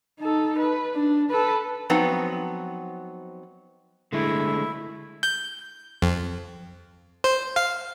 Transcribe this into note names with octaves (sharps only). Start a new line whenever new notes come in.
D#4 A4
B4
D4
A4 B4
F3 F#3 B3 C4 D#4
D3 G#3 A3 E4
G6
F2
C5
F5